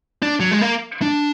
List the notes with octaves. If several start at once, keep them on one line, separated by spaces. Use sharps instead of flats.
D4
F#3
G#3
A#3
D4